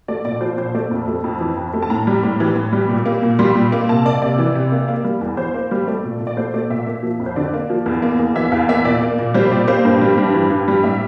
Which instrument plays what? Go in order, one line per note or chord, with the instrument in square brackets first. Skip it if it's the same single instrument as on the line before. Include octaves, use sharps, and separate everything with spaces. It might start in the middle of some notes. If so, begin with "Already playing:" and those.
[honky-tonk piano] A3 D5
A#2 D5
F3 C5
A#2 C5
A3 D5
F2
A3
F2
E3
F2
A3
A5
A2 A#5
G3
A2
E3
A2
G3
A#2
A#3
A#2
G3 C6
A#2
A#3
C3 A5
A#3 D5
C3 D5
E3
C3
A#3
A#3
G3
E2
E3 C5
A#3
G3
A3 D5
A#2
A#2
D5
A3 C5
A3 D5
A#2 E5
A#3
F3
F2
C5
D3 D5
A#3
F3
E2
A#3
E2
E3 E5
E2 F5
A#3 E5
A#2 D5
A#3
A#2
G3 C5
A#2 D5
A#3 C5
G2
G3
G2
E3
G2
G3
A2 E5